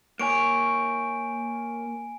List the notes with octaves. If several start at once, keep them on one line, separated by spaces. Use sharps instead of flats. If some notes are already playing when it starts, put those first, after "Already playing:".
A#3 C#5 G#5 D7